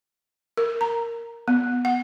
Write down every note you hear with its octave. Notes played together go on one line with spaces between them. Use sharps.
A#4
A#5
B3
F#5